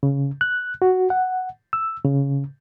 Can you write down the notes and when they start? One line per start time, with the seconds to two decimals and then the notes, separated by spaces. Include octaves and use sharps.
0.03 C#3
0.41 F#6
0.82 F#4
1.10 F#5
1.73 E6
2.05 C#3